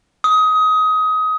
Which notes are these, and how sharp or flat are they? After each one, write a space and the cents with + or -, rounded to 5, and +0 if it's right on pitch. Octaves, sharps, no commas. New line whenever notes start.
D#6 +20